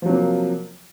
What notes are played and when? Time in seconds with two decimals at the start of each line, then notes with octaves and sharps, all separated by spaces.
0.02 F3
0.06 F#3
0.09 C3
0.13 A#3